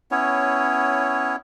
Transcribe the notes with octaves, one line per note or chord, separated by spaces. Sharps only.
B3 C#4 E4 C#5